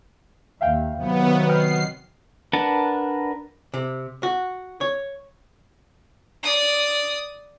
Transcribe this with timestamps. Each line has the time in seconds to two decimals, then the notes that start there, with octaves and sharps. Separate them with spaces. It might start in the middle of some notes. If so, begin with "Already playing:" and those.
0.61 D#2 E5 F5 G5
0.99 C3 D#3 F#3 B3
1.49 D#5 G5 F6 C7
2.53 D4 A#4 B4 F#5 A5
3.74 C3
4.23 F#4
4.81 C#5
6.43 D5 D#6